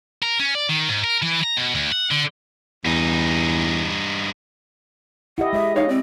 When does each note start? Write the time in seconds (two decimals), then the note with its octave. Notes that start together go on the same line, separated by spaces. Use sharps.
0.23 A#4
0.40 C#4
0.55 D5
0.69 D#3
0.89 G#2
1.04 A#4
1.22 E3
1.43 A#5
1.57 B2
1.75 D2
1.92 F#5
2.11 D3
2.85 E2 G2 D#4
5.38 E4 G4 D#5 F#5
5.53 G#3 D#5 E5
5.76 D#4 C#5 F5
5.89 C4 D5